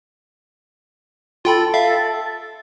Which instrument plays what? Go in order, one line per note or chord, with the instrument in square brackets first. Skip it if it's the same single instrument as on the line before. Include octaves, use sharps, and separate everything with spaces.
[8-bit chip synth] F4 G5 B5 [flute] A4
[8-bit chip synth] E5 F5